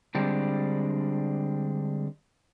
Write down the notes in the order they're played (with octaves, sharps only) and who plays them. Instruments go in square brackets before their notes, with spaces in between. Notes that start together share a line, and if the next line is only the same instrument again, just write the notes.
[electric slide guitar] D3 G3 G#3 C4 D4